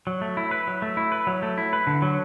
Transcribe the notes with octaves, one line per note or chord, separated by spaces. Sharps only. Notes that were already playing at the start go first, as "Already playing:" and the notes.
F#3
A3
E4
B4
F#3
A3
E4
B4
F#3
A3
E4
B4
D3
F#3